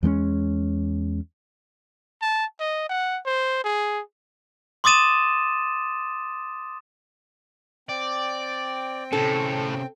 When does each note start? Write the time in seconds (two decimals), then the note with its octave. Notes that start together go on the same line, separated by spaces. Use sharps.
0.03 E2 G#3 A#3 C#4
2.22 A5
2.60 D#5
2.89 F#5
3.25 C5
3.64 G#4
4.84 C6 D6 D#6 A6 D#7 E7
7.89 C4 D5 G5
9.13 A2 C3 C#4 A4